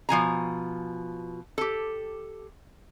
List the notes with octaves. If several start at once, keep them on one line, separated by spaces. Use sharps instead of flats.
B2 F3 G#5 A#5
G4 A4